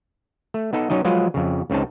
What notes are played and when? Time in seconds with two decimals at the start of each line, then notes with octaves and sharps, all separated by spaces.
0.54 A3
0.73 B3 D#4 A4
0.90 F#3 C#4 D#4 D#5
1.04 F3 F#3 G#3 F4 B4 D#5
1.34 F2 C#3
1.70 C#2 C#3 C4 D#4 A5